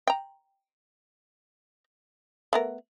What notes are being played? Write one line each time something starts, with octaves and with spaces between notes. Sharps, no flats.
G5 A#5
A3 B3 A#4